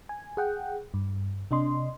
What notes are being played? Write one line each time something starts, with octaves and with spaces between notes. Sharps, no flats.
G#5
G#4 F#5 G5
G2
C3 D4 D#5 C6